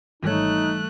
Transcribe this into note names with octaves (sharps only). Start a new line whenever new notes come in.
G#1 G#2 E3 G3 A3 D#4 C#5 F#6